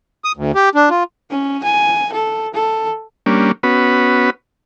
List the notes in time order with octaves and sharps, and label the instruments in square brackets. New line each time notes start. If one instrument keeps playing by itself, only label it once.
[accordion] D#6
D2
G4
D4
F4
[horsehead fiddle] C#4
G#5
A4
A4
[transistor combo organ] G3 A#3 C#4 D4
B3 C#4 F#4 B4